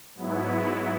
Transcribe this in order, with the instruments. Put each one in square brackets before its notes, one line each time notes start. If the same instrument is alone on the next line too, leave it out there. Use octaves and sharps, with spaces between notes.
[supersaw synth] G#2 F#3 B3 E4